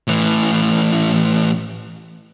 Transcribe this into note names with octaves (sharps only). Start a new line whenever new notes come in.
A2 E3